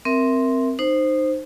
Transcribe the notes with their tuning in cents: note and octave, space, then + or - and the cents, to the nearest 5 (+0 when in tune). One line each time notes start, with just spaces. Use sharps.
C4 +0 A#4 +0 E5 +0
D#4 -25 C5 +0